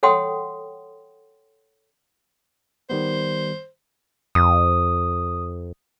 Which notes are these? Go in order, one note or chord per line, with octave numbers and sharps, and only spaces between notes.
A4 C#5 F#5 G5 C6 D#6
D#3 G3 B3 C5
F2 D#6